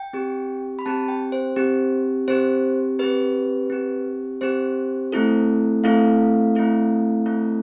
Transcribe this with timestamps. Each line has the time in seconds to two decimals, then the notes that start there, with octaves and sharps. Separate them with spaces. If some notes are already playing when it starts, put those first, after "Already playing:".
Already playing: G5
0.13 C4 G4
0.79 B5
0.86 C4 G4 A5
1.08 G5
1.32 C5
1.56 C4 G4
2.28 C4 G4 C5
2.99 C4 G4 B4
3.70 C4 G4
4.41 C4 G4 C5
5.12 A3 C4 E4 A4
5.84 A3 C4 E4 A4 F5
6.55 A3 C4 E4 A4
7.26 A3 C4 E4 A4